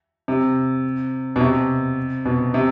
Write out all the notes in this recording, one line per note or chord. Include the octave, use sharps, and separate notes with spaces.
C3
B2
C3
B2
C3